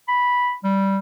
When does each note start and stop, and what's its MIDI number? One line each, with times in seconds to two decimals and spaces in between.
0.08 0.54 83
0.64 0.98 55